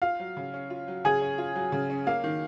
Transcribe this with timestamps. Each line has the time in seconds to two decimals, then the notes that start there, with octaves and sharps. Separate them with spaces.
0.02 F4 F5
0.20 F#3
0.37 C#3
0.54 C#4
0.70 F4
0.88 F#3
1.05 C#3 G#4 G#5
1.22 C#4
1.38 F4
1.55 F#3
1.72 C#3
1.90 C#4
2.07 A#3 F5
2.24 D#3